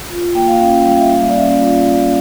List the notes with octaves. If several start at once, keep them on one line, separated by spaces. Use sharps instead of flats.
F4
A#3 G5
F5
C#4 F5
F5
G3 F5
E5
A#3 F5
D5
C#4 E5
F4